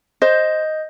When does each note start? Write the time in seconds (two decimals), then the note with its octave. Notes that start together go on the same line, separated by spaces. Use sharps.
0.22 C5 D#5 G6